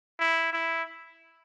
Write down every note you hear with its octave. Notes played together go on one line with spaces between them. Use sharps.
E4
E4